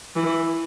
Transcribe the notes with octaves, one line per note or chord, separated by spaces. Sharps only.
E3